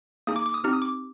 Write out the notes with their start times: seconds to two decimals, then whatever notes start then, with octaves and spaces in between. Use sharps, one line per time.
0.27 A#3 D#4 G#4 D#6
0.36 D6
0.46 D6
0.54 D#6
0.64 C4 D#4 G4 F6
0.73 D#6
0.82 D6